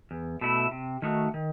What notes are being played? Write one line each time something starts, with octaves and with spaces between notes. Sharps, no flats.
E2
B2 A3 E4
C3
D#3 A3 D#4 F#4
D#3